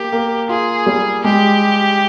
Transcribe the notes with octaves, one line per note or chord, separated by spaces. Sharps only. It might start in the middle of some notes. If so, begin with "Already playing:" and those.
Already playing: A#3 G4
A#3
F4 G#4
G3
G#3 G4